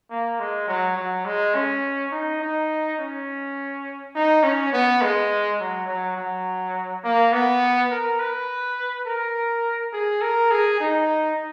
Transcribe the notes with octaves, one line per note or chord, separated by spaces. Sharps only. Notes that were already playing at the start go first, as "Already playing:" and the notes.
A#3
G#3
F#3
F#3
G#3
C#4
D#4
D#4
C#4
D#4
C#4
B3
G#3
F#3
F#3
F#3
A#3
B3
A#4
B4
A#4
G#4
A#4
G#4
D#4